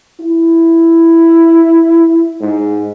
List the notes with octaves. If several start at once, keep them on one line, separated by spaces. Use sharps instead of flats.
E4
G#2